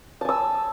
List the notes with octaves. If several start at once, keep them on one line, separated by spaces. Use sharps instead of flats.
G#5 A5 E6